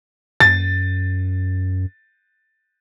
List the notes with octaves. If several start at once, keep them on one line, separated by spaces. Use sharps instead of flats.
F#2 A6